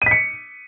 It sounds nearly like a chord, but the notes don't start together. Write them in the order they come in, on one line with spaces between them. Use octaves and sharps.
D#7 B6 C#7